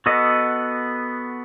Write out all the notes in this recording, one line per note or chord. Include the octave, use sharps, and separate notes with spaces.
B3 F#4 A4 D#5